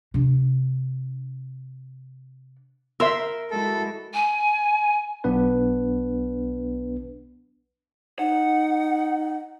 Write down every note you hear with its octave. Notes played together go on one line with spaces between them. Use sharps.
C3 D4
A#4 E5 C6 E6
G#3 E4 F#4 A4
G#5
B1 B3 D4 B4
D#4 F#5